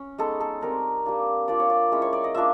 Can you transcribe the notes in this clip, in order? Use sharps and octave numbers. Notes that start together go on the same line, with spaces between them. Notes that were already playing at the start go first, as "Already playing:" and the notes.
Already playing: C#4
G#3 B3 D#4 A4
A4
G3 C4 D#4 A#4
G3 A#3 D4
A#3 D4 F4 D5
C#5
D5
G#3 C#4 E4
C#5
D5
D#5
A#3 D4 F4 E5